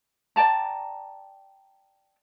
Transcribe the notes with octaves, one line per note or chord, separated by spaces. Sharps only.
D5 G5 A5 A#5